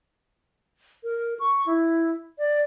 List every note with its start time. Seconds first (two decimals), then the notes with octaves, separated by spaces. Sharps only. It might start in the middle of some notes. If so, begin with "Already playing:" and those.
1.04 A#4
1.40 C#6
1.66 E4
2.38 D5